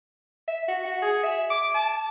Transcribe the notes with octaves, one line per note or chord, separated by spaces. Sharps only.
E5
F#4
F#4
G#4
E5
D6
A5